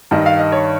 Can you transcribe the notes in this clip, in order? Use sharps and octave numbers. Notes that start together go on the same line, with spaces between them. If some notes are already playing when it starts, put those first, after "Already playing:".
G2 D#3 D#5
F5
D#5
C#5